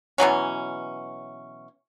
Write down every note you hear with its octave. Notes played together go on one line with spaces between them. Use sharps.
B2 E3 F#3 C#4